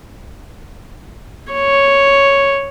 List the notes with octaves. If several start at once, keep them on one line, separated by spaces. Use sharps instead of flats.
C#5